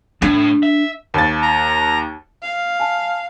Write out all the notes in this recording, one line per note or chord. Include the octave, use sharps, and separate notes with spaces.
A2 D4
E5
D#2 A6
A#5
F5
G#5 A5